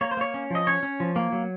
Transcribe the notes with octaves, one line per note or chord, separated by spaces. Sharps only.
A#3 C#5
C5
A#3 C#5
C#4
F3 D#5
C#4 C#5
C#4
F3
A#3
F#3